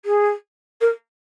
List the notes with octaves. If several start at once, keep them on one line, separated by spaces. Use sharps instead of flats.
G#4
A#4